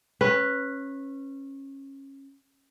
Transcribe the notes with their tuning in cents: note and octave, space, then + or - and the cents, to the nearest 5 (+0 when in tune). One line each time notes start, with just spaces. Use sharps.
C#4 -20 B4 +0